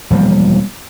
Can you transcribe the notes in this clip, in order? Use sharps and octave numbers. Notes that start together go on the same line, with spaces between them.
E1 F3 G3 A#3